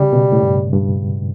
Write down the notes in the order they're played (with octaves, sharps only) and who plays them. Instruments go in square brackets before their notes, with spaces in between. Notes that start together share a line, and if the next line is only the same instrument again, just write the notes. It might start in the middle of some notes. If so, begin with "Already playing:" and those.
Already playing: [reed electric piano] C#3 [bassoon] G3
[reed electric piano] B2
A2
G2
G2